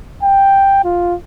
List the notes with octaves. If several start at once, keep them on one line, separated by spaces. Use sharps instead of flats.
G5
F4